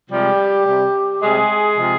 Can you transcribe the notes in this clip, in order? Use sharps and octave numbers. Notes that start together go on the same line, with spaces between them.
C3 F3 G3 G#3 G4
C3 G3
C3 G3 G#3 G#4
C3 F3 G#3